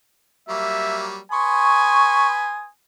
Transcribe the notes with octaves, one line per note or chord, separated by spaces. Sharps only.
F#3 G3 A#3 E5
B4 G#5 C6 C#6 D#6